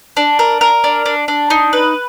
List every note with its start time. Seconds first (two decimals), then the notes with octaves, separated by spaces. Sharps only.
0.17 D4
0.39 A#4
0.61 A#4
0.84 D4
1.06 D4
1.28 D4
1.50 D#4
1.73 B4